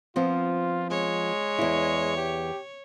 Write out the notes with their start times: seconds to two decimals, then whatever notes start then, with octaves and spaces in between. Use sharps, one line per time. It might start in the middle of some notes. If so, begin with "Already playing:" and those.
0.16 F3 B3 C4 F4
0.90 G#3 C#5
1.59 E2 E4
2.17 G4